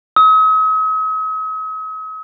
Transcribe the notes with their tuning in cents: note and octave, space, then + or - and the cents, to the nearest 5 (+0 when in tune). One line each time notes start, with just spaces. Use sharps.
D#6 +45